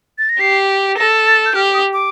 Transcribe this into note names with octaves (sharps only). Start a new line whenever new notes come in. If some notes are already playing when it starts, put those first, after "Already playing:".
A6
A#6
G4 C7
A4 A#6
A6
G6
G4 F6
D#6
D6